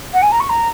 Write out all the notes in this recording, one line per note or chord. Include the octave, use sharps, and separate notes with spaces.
F#5
G#5
A#5
C#6
A#5